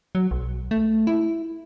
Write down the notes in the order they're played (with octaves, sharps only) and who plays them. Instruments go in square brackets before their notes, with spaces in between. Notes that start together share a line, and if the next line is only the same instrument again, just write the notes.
[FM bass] F#3
B1
A3
E4